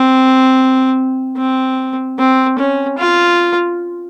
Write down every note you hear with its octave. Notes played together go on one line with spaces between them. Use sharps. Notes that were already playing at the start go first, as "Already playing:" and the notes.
Already playing: C4
C4
C4
C#4
F4